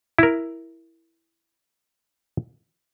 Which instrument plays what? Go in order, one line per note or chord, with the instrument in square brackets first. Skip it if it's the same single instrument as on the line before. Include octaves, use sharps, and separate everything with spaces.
[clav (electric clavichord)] E4 A#4